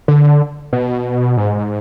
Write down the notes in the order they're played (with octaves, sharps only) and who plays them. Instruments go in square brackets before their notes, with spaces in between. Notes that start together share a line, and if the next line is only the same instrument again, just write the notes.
[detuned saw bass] D3
B2
G#2